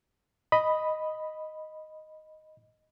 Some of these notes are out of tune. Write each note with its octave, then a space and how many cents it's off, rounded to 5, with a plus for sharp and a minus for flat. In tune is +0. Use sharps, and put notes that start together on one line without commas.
D#5 +0 B5 +0